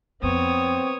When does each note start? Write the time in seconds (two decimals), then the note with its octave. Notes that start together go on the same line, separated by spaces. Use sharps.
0.23 F2 B3 C4 C#5 D#6